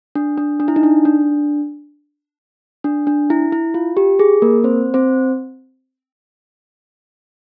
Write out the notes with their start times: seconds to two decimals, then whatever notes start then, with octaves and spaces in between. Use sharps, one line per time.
0.15 D4
0.38 D4
0.60 D4
0.68 E4
0.76 D#4
0.83 D4
1.05 D4
2.84 D4
3.07 D4
3.30 E4
3.52 E4
3.74 F4
3.97 G4
4.19 G#4
4.42 A#3 A#4
4.64 C4 C5
4.94 C4 C5